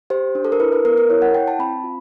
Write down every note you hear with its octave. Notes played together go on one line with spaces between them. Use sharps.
G4 C5
D4
A4
A#4
E4 B4
B4
B3 A#4
A#4
E4 C#5
F#5
E4 G5
A5
C4 B5
F4